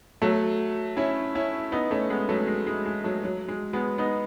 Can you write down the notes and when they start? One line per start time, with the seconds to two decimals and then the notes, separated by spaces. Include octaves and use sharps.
0.22 F#3 A3
0.97 C#4 E4
1.35 C#4 E4
1.72 B3 D#4
1.91 A3 C#4
2.10 G#3 B3
2.29 F#3 A3
2.48 G#3
2.67 G#3
2.85 G#3
3.04 F#3 A3
3.23 F#3
3.48 G#3
3.73 G#3 B3
3.98 B3 D#4